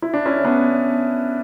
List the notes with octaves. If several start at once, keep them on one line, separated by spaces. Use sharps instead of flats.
E4
D4
C#4 E4
B3 D4